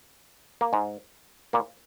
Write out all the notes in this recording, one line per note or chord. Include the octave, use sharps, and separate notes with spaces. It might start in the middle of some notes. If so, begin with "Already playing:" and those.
A#3
G#2 G#3
A#2 A#3